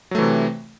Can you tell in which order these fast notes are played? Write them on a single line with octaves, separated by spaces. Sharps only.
F#3 A3 E3 C3